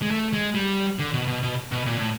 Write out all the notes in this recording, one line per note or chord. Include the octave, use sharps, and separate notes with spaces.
G#3
A3
G#3
G3
D3
B2
B2
B2
B2
A#2
A2